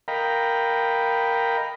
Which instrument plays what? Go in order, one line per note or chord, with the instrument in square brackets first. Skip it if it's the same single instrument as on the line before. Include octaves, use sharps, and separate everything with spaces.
[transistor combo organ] A#4 D#5 F5 G5 A#5 B5